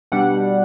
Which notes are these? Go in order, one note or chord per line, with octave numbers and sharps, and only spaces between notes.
B2 G3 D4 F#5